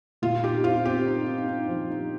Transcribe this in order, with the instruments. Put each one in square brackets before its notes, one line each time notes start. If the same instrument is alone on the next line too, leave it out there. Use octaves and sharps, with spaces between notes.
[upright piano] A#2 [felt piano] F4
[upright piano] D#4 [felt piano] G4
[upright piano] C4 [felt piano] F4
[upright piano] C4 [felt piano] G4
[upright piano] D#4
D#4
D#4
F3
D#4